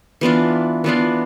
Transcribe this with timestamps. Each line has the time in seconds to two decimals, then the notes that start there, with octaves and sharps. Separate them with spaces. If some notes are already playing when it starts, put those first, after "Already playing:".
0.21 E3 B3 D4 F4
0.84 E3 B3 D4 F4